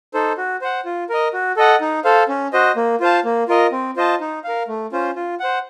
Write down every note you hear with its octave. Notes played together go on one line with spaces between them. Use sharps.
D#4 A4 C5
F#4
C5 F#5
F4
A#4 D#5
F#4
A4 D#5 F#5
D#4
A4 C5 F5
C#4
F#4 C5 D#5
A#3
F4 C5 F5 A5
A#3
F4 A#4 D#5
C4
F4 C5 D#5 A5
D#4
A#4 F5
A3
C#4 F4 C5
F4
C5 F#5